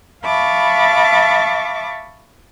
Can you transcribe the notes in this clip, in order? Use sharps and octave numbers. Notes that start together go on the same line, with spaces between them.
E5 F5 A5 B5 C#6 D6